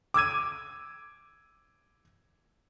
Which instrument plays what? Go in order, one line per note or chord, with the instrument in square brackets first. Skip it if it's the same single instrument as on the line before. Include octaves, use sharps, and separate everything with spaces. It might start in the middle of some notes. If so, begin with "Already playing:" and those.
[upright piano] D6 E6 G#6 D#7